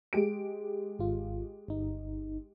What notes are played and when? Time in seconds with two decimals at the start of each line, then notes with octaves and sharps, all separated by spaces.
0.13 G#3 G4 D7
0.99 G#1 F4
1.68 G1 D#4